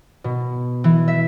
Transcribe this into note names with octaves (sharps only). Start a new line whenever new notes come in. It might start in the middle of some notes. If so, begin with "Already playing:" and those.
B2
E3
E5